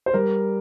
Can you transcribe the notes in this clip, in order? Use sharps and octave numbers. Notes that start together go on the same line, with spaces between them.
C5
G3 A#4